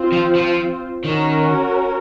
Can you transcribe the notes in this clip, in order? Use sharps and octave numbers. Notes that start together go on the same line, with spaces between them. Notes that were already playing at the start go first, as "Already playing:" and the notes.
Already playing: C4 F4 C5
F3
F3
D#3 C#4 F#4 A#4